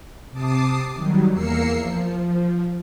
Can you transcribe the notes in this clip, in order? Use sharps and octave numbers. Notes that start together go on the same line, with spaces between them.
C3 A5 D6 D#6 C7
D#3 F#3 G3
E2 A#3 A#4 E6 C7 C#7
F3